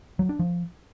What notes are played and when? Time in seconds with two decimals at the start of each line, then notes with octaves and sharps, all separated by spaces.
0.19 F#3
0.29 D4
0.39 F3